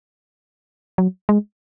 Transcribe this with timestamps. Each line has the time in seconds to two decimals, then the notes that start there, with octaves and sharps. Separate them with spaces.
0.98 F#3
1.29 G#3